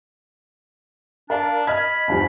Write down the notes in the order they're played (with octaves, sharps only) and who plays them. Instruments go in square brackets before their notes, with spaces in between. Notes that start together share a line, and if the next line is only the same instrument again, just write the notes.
[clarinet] D4 [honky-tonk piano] A#4 D5 F5
[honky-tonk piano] D#5 F6 G#6 [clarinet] B5
[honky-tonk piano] E2 G2 F3